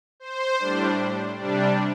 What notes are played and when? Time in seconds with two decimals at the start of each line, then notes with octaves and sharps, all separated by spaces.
0.20 C5
0.59 A2 G3 D4
1.38 C3 G3 D4 D5